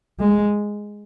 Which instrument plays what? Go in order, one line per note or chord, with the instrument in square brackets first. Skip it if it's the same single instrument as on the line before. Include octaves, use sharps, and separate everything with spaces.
[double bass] G#3